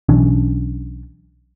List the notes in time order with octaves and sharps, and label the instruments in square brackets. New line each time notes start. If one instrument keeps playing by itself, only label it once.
[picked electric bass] B1 E3 C#4 D4